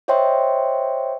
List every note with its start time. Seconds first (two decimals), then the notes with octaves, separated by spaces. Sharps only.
0.08 C5 C#5 D#5 E5 G5 C6